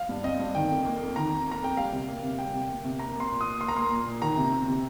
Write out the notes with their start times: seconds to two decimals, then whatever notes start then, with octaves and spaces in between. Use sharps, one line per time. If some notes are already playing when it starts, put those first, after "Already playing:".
Already playing: F5
0.09 G2
0.24 C4 D#5
0.39 G2
0.55 D#3 G5
0.70 F2
0.85 A#3
1.01 F2
1.16 D#3 A#5
1.31 F2
1.47 A#3 A#5
1.62 F2 G5
1.77 G3 F5
1.92 C3
2.08 A#3
2.23 C3
2.38 G3 G5
2.54 C3
2.69 A#3
2.84 C3
2.99 A#3 A#5
3.15 A#3
3.20 C6
3.31 A#2
3.41 A#2 D#6
3.61 A#3 C6
3.68 A#5
3.75 A#3 C6
3.91 A#2
4.07 A#2
4.22 D#3 A#5
4.37 C3
4.52 C4
4.68 C3